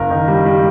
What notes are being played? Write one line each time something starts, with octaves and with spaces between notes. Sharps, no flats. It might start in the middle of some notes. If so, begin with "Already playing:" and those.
Already playing: F#1 A#4
D#3
G3
G3